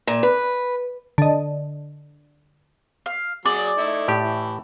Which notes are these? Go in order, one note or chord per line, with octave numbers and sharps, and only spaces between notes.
A#2
B4
D3 D#5
F5
F#3 G#4 D5
A3 D#4 E4
A2 G4
E3